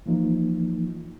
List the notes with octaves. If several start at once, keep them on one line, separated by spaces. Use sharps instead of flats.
E3 F3 A#3 D#4 F4